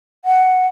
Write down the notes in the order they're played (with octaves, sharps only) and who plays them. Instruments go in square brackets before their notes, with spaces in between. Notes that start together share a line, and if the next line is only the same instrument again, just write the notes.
[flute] F#5